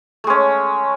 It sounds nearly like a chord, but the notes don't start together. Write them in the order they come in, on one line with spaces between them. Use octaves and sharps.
A3 G#3 C#4